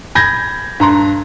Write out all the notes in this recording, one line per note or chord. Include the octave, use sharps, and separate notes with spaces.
B5 G6 G#6 A#6
G2 A#5 C6